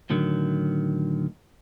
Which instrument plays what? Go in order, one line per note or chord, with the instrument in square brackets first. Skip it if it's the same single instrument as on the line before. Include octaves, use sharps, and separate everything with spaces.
[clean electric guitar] A2 D3 D#3 F#3